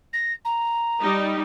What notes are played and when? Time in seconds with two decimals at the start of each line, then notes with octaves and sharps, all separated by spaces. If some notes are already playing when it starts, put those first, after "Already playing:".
0.13 A#6
0.45 A#5
1.01 G3 D#4